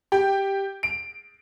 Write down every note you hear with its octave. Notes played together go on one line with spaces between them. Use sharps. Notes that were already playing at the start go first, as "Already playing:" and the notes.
G4
D7